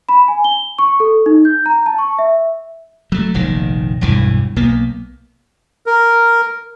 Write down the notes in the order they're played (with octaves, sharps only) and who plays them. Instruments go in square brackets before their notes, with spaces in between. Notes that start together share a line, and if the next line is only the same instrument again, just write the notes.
[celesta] B5
G#5
G7
C#6
A4
D#4
G6
A#5
A5
C#6
E5
[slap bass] F#3 A3
F1 A#1 D#3
E1 B1 G2 E3
B1 A#3 B3
[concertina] A#4